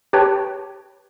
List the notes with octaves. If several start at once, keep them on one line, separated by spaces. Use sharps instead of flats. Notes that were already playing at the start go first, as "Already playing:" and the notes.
G4 B4 C#5 G5 A5